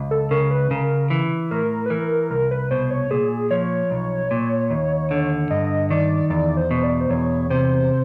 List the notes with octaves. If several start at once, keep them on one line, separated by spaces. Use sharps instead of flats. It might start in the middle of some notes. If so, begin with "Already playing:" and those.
Already playing: C#2
A4
C#3 A#4
B4
C#3 A#4
E3
A2 A#4
B4
E3 A#4
C2 A#4
B4
B2 C5
C#5
A#2 G#4
F3 C#5
B1
A#2
D#2
D3
G2 D#5
D#3 D5
E2 D5
C5
B2
D5
C5
E2 C#5
C3 C5